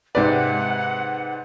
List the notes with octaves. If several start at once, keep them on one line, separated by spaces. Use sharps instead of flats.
G#2 C3 B4 D5 F#5